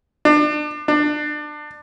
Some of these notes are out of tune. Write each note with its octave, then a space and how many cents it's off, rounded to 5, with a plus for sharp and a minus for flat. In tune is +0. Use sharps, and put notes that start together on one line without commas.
D4 +30
D4 +25